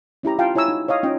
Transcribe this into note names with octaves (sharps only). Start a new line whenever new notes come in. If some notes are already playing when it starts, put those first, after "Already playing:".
C#4 E4 G4 A#5
F4 F5 G5 A5
E4 C#5 G#5 A#5 E6
D#4
C#5 D#5 F5 D#6
C#4 D#4 F4 D#5 G5